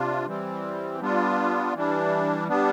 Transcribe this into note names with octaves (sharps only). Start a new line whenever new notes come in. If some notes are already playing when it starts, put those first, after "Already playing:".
Already playing: C3 D4 F4
E3 G3 C4
G3 B3 D4 F4
E3 G3 D4
G3 B3 D4